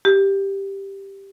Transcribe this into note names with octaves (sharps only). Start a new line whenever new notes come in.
G4